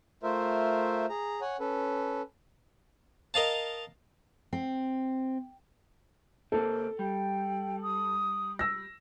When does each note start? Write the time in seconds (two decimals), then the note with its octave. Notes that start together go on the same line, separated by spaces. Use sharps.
0.23 A3 F4 A#4 C5 E5
1.09 G#4 A#5
1.41 C#5 F#5 G#5
1.60 C#4 A4 B4
3.34 A#4 D#5 F5 A5
4.53 C4
6.52 C3 A#3 C4 A4
6.99 G3 G5
7.82 D#6
8.59 E6 A#6